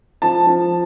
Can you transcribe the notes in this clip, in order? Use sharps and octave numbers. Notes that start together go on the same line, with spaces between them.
F3 A5
F3